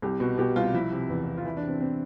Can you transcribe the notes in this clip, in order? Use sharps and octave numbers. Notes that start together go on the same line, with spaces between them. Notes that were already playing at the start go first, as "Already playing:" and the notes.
C2 G4
B2
B2 G4
C2 F4
F3 E4
C3
E2
E2
F4
E3 E4
D4
C3
C4
C4